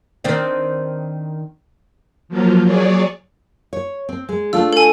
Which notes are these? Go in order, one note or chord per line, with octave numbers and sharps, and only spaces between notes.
D#3 C4 D4
F3 F#3 A#3 F4
F#3 G#4 C#5 D5
C#5
C4
G#3
A3 D4 F4 E6
A4 G#5